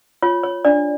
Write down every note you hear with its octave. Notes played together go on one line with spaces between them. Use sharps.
F4 C#5
C#5
D4 D5